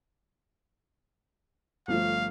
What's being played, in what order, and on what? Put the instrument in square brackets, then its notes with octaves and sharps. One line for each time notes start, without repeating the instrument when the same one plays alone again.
[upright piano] G1 F3 A3 [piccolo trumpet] F5